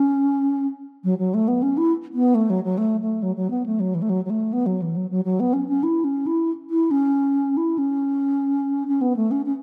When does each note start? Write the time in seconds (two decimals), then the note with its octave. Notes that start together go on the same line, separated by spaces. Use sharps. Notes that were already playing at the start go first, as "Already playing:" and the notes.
Already playing: C#4
1.04 F#3
1.19 F#3
1.34 A3
1.48 B3
1.62 C#4
1.77 E4
2.14 B3
2.35 A3
2.50 F#3
2.64 F#3
2.78 A3
3.01 A3
3.23 F#3
3.36 F#3
3.50 B3
3.66 A3
3.80 F#3
3.95 E3
4.02 A3
4.09 F#3
4.25 F#3
4.30 A3
4.53 B3
4.66 F#3
4.82 E3
4.96 F#3
5.11 F#3
5.25 F#3
5.40 B3
5.53 C#4
5.68 C#4
5.83 E4
6.04 C#4
6.27 E4
6.70 E4
6.91 C#4
7.57 E4
7.78 C#4
8.88 C#4
9.01 B3
9.16 A3
9.31 C#4
9.46 C#4